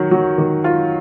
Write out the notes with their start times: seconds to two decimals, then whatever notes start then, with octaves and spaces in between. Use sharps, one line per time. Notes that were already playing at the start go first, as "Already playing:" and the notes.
Already playing: D#3 F#3
0.11 F#3
0.38 D#3
0.64 F4